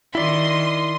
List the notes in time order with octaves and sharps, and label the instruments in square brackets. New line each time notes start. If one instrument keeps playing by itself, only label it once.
[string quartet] D#3 [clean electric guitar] E4 D5 [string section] C6 D#6